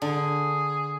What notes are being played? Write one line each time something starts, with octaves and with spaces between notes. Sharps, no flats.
D3 G#4